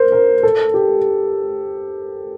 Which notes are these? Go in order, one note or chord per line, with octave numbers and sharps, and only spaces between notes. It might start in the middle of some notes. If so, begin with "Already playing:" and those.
Already playing: A#4 C5
A#4
A4
G4